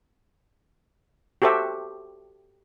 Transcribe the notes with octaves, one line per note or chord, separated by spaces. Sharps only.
F#4 G4 A4 C5 E5